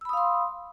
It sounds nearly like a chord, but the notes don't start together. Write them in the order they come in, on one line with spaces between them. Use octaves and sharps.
E6 B5 D#6 F5 C6